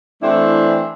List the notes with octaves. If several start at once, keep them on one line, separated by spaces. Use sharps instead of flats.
E3 A3 C4 D4 E4